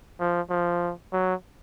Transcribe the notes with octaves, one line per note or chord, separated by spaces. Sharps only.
F3
F3
F#3